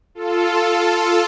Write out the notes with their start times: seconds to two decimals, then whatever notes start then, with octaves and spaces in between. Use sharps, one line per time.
0.15 F4 A4